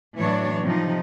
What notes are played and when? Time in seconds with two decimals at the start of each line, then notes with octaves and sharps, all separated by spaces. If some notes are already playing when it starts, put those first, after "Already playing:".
0.16 A2 E3 F#3 D4 C#5
0.63 C3 F3 D#4